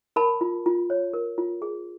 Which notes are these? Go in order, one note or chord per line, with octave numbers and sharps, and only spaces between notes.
A#4 A5 B5
F4
F4
C#5
A#4
F4
G#4